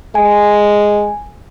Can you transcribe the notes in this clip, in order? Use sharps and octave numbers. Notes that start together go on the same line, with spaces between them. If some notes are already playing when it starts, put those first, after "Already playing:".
G#3 G#5